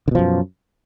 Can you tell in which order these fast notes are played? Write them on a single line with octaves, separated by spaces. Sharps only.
D3 B2 F3 F#2